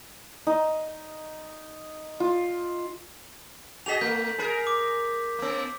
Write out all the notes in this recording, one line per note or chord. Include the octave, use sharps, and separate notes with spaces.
D#4
F4
F#4 G#4 D#5 B6 F7
A3 G6
G#4 A#4
D6
A#3 B3